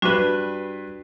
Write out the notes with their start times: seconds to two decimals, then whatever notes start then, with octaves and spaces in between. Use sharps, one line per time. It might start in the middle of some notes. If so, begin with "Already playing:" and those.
0.02 G2 D4 F#4 B4